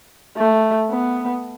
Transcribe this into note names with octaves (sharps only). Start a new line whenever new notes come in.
A3
B3